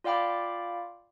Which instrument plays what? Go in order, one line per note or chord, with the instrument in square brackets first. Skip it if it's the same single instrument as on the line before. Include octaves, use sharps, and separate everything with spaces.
[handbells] F4 D5 F5 G5 B5 D6